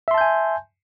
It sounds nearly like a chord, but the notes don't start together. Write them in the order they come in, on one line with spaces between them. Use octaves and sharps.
E5 C6 A5 G6 G#5